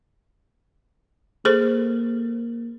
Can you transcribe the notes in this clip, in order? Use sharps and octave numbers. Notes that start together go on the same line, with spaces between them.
A#3 G#4 A4 C5